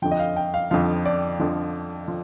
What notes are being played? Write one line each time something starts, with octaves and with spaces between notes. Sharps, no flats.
F2 D3 F3 G5
D#5
F5
G5
F5
F2 D3 F3 F5
D5
F2 D3 F3
F3